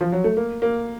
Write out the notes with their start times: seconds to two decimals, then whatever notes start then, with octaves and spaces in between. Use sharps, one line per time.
0.01 F3
0.12 F#3
0.24 A3
0.37 A#3
0.62 A#3